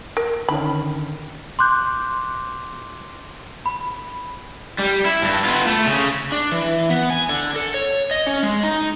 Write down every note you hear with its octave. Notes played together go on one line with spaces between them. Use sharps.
A#4
D3 D#3 C#4 B5
C6 D6 F#6 G6
B5
G3
E4
G2
B3 F4
A3
C#3
D4
E3
B3
G#5
D3
A4
C#5
D#5
C#4
G#3
D#4